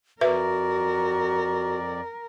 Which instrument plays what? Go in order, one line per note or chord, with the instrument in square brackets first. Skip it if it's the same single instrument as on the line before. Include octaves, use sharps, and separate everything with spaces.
[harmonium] F2 D5 [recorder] F#4 [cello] A#4 [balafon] B4 E5